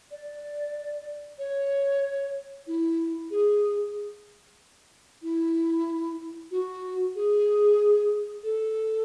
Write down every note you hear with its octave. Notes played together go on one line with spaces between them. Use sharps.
D5
C#5
E4
G#4
E4
F#4
G#4
A4